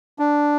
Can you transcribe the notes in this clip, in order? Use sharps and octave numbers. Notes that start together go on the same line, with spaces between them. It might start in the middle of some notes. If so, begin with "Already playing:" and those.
D4